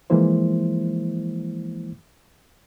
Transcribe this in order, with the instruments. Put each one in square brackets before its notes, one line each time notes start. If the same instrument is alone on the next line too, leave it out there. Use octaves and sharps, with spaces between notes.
[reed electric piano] E3 F3 G#3 A#3 E4 C5